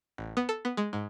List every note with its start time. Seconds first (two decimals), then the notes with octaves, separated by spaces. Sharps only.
0.18 A1
0.37 B3
0.49 A4
0.65 B3
0.77 G#3
0.93 G#2